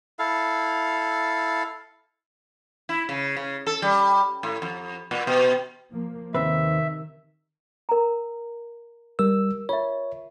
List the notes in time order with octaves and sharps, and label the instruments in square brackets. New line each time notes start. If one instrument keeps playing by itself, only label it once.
[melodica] E4 A4 F5
[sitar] E4
C#3
C#3
A4
G3
A2
F2
A#2
B2
[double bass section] F3 A#3
[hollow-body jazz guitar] D#2 C4 B4 [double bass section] C3 D#3 [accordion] E5
[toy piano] A#4 A#5
[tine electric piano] G3 E6 [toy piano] A#4
[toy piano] F4 E5 [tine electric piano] C#5